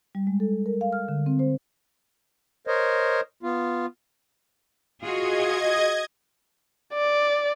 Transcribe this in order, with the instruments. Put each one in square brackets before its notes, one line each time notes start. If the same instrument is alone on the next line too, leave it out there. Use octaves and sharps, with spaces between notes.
[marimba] G3
G#3
A4
A#4
F5
F6
D3
C4
C5
[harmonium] A#4 C5 C#5 D#5
B3 F4
[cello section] F4 F#4 G#4 [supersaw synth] D#5 G#6
[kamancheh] D5